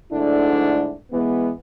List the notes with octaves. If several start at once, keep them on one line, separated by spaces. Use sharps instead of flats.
G#2 D3 A3 D4 E4
E3 G#3 B3